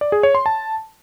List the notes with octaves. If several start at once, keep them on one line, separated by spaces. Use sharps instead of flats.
D5
G#4
C#5
C6
A5